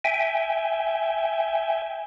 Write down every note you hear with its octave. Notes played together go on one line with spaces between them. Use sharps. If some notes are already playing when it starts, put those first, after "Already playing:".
E5 G5 G#5